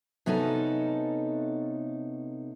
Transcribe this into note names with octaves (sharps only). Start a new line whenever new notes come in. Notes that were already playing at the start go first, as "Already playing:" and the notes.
C3 B3 C#4 D#4 F#4 A4